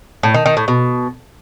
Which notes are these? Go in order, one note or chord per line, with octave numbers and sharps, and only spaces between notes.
A2
D#3
D#3
A2
B2